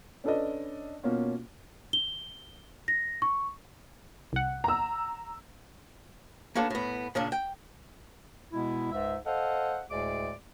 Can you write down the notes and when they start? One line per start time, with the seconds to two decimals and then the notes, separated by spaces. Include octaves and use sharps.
0.24 C#4 D4 A4 B4 D5 D#5
1.04 B2 A#3 C#4 F4
1.93 G7
2.88 A#6
3.22 C#6
4.33 C2 F#5
4.64 A#5 E6
6.55 A#3 B3 C#4 D4 F#4 A4
6.70 A2 B3
7.15 A#2 C#3 C#4 D4
7.32 G5
8.53 B2 G#3 B3 E4
8.92 C#2 G#2 E5
9.26 A4 C5 D#5 F5 F#5
9.90 D2 A2 G#3 G#4 D5 D6